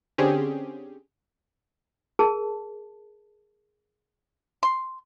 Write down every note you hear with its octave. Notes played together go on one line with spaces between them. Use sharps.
D3 C4 C#4 G4 G#4
G#4 A#4 A5
C6